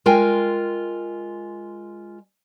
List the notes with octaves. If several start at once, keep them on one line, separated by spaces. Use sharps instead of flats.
G#3 F4 A#4 G5 G#5